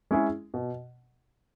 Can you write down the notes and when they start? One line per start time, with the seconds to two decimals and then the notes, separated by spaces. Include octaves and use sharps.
0.11 G#3 C#4 E4 G#4
0.54 B2